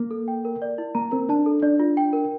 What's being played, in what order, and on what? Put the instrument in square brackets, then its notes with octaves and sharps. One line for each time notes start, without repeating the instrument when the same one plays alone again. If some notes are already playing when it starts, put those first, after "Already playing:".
Already playing: [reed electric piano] A#3
[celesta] A4
G5
A#4
D5
E4
[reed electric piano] A#3 [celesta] A#5
[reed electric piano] C4 [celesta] A#4
[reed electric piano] D4 [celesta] A5
[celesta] A4
[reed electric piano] D4 [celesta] D5
[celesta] F4
G5
A#4